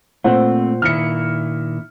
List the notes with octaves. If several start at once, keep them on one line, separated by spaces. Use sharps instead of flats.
A#2 A3 C4 C5 F#5
A#2 D#3 E4 F6 C#7